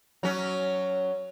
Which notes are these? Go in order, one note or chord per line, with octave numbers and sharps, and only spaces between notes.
F#3 C#4